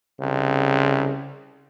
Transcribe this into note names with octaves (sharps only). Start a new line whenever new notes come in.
C2 C#3